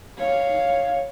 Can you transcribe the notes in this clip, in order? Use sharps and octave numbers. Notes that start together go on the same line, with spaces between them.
C#5 F5